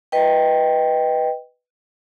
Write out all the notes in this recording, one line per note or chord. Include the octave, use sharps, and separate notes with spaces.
B4 D#5 G5